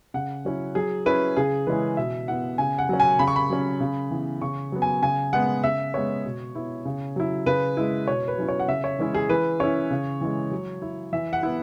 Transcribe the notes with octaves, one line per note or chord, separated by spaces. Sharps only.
C#3 F#5
F#3 C#4 E4
F#3 G#4
C#4 E4 B4
C#3 G#4
E3 G#3 C#4 E4 B4
B2 E5
B3 E4 F#5
C#3 G#5
F#5
F#3 C#4
G#5
C#3 B5
C#6
B5
F#3 C#4
C#3
E3 B3
C#3 C#6
F#3 B3
G#5
C#3 G#5
G#3 B3 F#5
C#3 E5
G#3 B3 C#5
B2
B3 E4
C#3
F#3 E4
C#3 B4
G#3 E4
B2 C#5
B4
F#3 C#4 E4
C#5
F#5
C#3 E5
C#5
E3 G#3 C#4 E4
G#4
E3 B4
C#4 E4 C#5
C#3
E3 G#3
F#3
E4
E3 E5
F#5
B3 E4